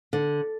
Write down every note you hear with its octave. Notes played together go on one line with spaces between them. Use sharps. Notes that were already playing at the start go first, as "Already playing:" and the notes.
D3